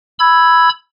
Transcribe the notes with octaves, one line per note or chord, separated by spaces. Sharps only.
B5 E6 G#6